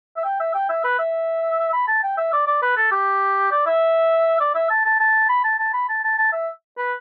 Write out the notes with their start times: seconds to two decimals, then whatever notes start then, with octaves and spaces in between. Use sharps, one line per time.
0.16 E5
0.24 G5
0.40 E5
0.54 G5
0.69 E5
0.84 B4
0.99 E5
1.73 B5
1.88 A5
2.03 G5
2.17 E5
2.32 D5
2.47 D5
2.62 B4
2.77 A4
2.91 G4
3.51 D5
3.66 E5
4.40 D5
4.55 E5
4.70 A5
4.85 A5
5.00 A5
5.29 B5
5.44 A5
5.59 A5
5.73 B5
5.89 A5
6.04 A5
6.18 A5
6.32 E5
6.77 B4